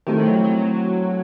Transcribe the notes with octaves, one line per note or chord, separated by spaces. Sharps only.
D#3 A3 C4 E4 G4
F#3
F#3